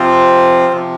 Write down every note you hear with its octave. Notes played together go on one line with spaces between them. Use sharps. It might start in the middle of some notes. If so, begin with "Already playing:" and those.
Already playing: C3 F3 C4 F4 C5
C3 F3